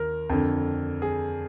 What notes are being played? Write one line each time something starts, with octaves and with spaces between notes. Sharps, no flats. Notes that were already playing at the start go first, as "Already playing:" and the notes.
Already playing: D#2 A#4
F2 D3
G#4